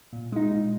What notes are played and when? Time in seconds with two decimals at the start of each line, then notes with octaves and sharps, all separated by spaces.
0.13 A#2
0.32 G#3 D#4
0.52 A#2